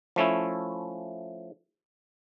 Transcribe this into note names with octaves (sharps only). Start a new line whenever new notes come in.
F3 A3 C#4 E4